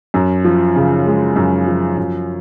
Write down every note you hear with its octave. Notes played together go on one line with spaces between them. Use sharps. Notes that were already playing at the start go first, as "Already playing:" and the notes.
F#2
F3
C#3
G#3
F#2
F3
F#2